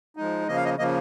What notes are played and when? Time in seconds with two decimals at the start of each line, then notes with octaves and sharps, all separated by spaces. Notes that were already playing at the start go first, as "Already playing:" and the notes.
0.17 F3 G#3 D#4
0.48 C#3 F3 A#3 D#5
0.56 F5
0.65 D#5
0.78 C#3 F3 A#3 D#5